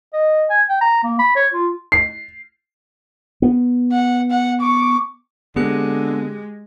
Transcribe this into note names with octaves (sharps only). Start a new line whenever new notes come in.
D#5
G#5
G5
A#5
A#3
B5
C#5
F4
C7
B3
F#5
F#5
C#6 D6
D3 G#3 B3 C4 G4 G#4 F#6